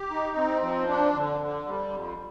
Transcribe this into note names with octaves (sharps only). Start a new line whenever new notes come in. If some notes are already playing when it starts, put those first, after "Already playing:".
Already playing: G4
D#4
C4
F3
D4
D3
D3
G3
F2